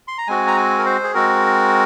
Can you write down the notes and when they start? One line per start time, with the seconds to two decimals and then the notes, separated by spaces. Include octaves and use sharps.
0.08 C6
0.18 A#5
0.27 G#3 C4 F#4 G#5
0.47 A#5
0.57 G#5
0.78 A#4
0.86 C5
1.04 G#4
1.14 G#3 C4 F#4 A#4